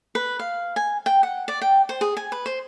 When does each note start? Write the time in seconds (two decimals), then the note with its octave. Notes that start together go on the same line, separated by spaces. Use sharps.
0.15 B4
0.39 F5
0.76 G#5
1.06 G5
1.23 F#5
1.48 D5
1.61 G5
1.89 C5
2.01 G#4
2.17 G#5
2.32 B4
2.46 C5